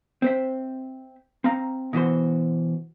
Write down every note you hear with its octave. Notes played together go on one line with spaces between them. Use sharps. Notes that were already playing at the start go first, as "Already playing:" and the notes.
C4 C5 E5
C4 F5 A#5
B2 E3 F#4 C5